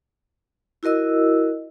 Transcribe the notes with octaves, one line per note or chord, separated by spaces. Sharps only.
E4 F#4 A#4 D#5 E6